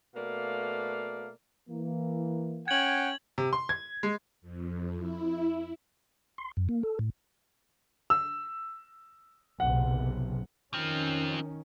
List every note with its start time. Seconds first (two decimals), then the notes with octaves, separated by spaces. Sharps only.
0.15 B2 A3 A#3 D5 F5
1.70 E3 A#3
2.68 C#4 F#5 G5 G#6 F#7
3.38 C3
3.53 C6
3.69 G#6
4.03 G#3
4.41 F2
4.96 E4
6.38 C6
6.57 F#2
6.69 A#3
6.83 A4
6.99 A2
8.10 E6
9.60 F#1 B1 C3 F#5
10.74 D#3 F3 C4 C#4